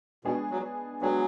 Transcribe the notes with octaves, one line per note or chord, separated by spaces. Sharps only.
B2 G#3 B3 D4 G#4
F#3
F#3 G#3 B3 D4 G#4